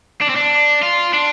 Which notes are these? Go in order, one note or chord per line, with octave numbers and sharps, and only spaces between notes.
D4
C4
D4
F4
D4